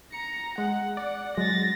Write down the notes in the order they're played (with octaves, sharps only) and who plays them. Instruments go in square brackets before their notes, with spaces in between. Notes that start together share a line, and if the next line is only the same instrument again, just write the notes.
[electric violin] A#5 [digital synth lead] C#7
[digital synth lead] G#3 [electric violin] F#5
[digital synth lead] D5 [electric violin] F#5
[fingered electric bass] F#3 [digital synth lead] G#3 [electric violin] A6 A#6